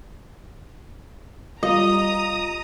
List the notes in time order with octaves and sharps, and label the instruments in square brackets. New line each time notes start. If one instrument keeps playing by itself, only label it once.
[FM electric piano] G3 F4 [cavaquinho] D#5 [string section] A#5 D#6